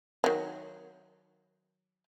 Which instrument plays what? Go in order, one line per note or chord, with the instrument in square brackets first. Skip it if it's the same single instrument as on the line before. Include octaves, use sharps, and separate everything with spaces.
[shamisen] D#3 F#3